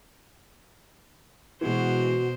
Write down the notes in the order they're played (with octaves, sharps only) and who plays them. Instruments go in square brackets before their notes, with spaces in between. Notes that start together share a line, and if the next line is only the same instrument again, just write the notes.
[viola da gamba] B2 C5 [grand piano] E3 G#3 [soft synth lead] F#4